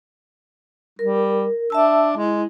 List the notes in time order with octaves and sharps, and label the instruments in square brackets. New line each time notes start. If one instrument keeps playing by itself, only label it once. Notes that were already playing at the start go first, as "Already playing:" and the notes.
[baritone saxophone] G3 [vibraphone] A#4
[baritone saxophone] D4 [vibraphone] E5 A5 E6
[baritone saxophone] G#3 [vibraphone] E4